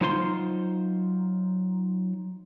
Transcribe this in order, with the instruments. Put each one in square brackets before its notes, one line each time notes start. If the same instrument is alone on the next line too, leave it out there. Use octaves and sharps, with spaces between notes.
[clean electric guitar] F#3 D#4 F4 C5 G#5 C6